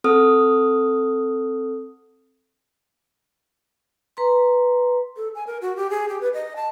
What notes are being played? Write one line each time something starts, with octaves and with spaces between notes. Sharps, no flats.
C4 A4 D#6 F6
B4 A#5 C6
A4
G#5
A#4
F#4
G4
G#4
G4
B4
D#5
A5